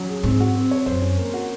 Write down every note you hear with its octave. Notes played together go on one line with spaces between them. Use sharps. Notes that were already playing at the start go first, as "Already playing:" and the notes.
Already playing: F#3 C#4
G#4
G#2 C4
F#4
C4
C#5
F#2 C5
C#4
A#3
F#4